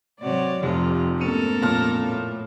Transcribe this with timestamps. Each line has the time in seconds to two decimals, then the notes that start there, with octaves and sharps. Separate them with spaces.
0.21 G#2 C3 F#3 F#4 C#5 D5
0.63 F1 F2 C3 F3 F4
1.21 G#2 A3 B3 C#4 A4 A#4
1.62 F2 A#2 A5 F6 A#6
1.98 A2